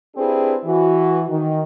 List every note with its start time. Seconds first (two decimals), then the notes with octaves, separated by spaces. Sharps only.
0.16 C4 D4 E4 G4 G#4 B4
0.65 E3 F#4
1.29 D#3